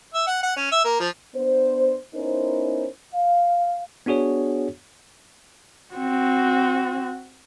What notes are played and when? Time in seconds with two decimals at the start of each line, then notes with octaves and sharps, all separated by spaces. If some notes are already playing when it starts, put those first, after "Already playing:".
0.14 E5
0.27 F#5
0.43 F#5
0.57 C#4
0.72 E5
0.85 A#3
1.00 F3
1.35 B3 D4 C5
2.15 B3 C#4 D#4 E4 A#4 C5
3.14 F5
4.06 B3 D4 F#4 G#4 C#5
5.94 C4 F#4